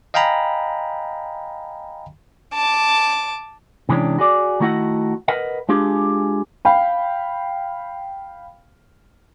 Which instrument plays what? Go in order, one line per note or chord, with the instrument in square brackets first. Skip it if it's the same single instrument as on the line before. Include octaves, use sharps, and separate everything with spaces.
[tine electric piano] D#5 F5 G5 G#5 A#5 B5
[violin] A5 D6
[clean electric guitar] C3 E3 G#3 C#4 D4
F#4 G#4 D5
D#3 A3 E4 F#4 D#5 F#5
A#4 B4 D#5 F#5
G#3 D4 F4 G4 G#4
[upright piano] F5 G5 B5